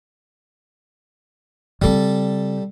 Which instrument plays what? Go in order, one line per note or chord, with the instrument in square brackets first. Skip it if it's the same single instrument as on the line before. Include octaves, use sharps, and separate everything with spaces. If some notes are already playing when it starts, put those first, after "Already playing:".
[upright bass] C#3 C4 [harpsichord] G3 A4